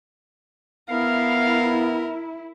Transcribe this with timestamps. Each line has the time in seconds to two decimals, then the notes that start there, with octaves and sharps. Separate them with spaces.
0.90 B3 E4 A#4 F5